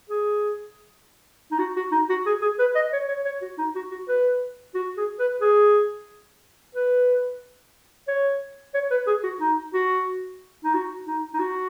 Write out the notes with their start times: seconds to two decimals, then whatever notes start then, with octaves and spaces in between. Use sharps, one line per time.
0.10 G#4
1.52 D#4
1.59 F#4
1.76 F#4
1.92 D#4
2.10 F#4
2.26 G#4
2.42 G#4
2.59 B4
2.75 D#5
2.93 C#5
3.08 C#5
3.25 C#5
3.42 F#4
3.58 D#4
3.76 F#4
3.92 F#4
4.08 B4
4.75 F#4
4.97 G#4
5.19 B4
5.42 G#4
6.75 B4
8.08 C#5
8.74 C#5
8.91 B4
9.07 G#4
9.24 F#4
9.41 D#4
9.74 F#4
10.64 D#4
10.74 F#4
11.07 D#4
11.34 D#4
11.40 F#4